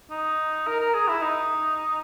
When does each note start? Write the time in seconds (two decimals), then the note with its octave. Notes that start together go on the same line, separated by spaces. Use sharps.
0.11 D#4
0.67 A#4
0.81 A#4
0.94 G#4
1.08 E4
1.22 D#4